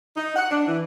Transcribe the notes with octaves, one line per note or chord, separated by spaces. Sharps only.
D#4
F#5
D4
E3